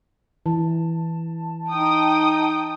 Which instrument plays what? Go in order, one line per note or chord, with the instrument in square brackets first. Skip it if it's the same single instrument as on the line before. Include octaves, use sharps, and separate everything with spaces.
[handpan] E3 [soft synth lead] A5
[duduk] D#4 [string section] G5 D#6